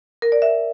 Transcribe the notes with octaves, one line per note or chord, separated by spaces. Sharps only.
A#4
D5
E5